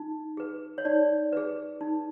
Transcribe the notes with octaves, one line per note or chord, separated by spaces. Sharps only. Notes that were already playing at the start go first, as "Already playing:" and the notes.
Already playing: D#4
G#4 B4
C#5
D#4 D5
G#4 B4
D#4